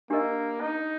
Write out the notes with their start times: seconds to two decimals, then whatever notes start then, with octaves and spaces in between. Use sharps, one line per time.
0.10 A#3 D4 G4 A#4 D#5
0.61 D#4